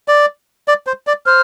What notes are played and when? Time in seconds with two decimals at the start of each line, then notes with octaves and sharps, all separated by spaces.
0.08 D5
0.68 D5
0.87 C5
1.07 D5
1.26 C5 F6